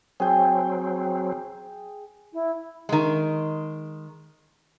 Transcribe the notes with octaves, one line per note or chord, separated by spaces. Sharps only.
F#3 C4 G#4 G5
E4
D#3 G#3